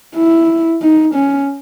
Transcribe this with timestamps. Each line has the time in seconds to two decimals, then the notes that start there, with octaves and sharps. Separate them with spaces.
0.16 E4
0.82 D#4
1.15 C#4